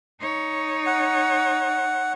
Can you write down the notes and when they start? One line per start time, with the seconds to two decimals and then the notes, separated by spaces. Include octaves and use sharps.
0.21 D#4 C#5
0.86 F#5